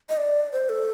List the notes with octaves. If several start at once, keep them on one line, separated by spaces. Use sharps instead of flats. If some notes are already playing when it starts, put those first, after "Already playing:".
D#5
D5
C5
A4